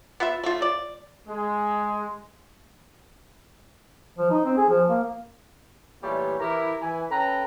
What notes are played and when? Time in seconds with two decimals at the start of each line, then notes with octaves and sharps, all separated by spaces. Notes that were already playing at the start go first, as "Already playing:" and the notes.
0.20 B3 F4 B4 E5
0.44 A3 F4
0.62 D5
1.28 G#3
4.18 F3
4.31 D#4
4.45 C4
4.57 G#4
4.69 F3
4.88 A#3
6.03 A#2 E3 G3 A3 G4 C#5
6.40 E3 E4 G4 A#4
6.81 E3 E4 G#5
7.10 C#4 A4 B4 G5 A#5